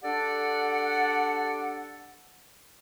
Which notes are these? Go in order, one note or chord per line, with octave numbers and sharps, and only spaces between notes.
D4 G4 A4 D5 F#5